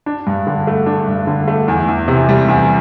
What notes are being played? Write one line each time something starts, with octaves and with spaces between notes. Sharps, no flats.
D4
G2
D3
A3
D4
G2
D3
A3
E2
E2
C3
G3
E2